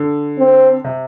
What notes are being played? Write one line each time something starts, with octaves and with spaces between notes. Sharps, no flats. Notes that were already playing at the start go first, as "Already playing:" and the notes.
Already playing: D3
C4
C3